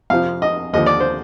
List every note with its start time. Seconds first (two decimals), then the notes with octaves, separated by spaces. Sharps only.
0.10 F2 C3 F3 F5
0.42 D#5
0.73 D#2 D3 F3 D#5
0.86 D5
1.00 C5